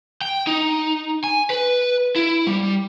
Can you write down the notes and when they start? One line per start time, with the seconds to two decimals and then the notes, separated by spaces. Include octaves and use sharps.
0.21 G5
0.47 D#4
1.24 G#5
1.50 B4
2.16 E4
2.47 G3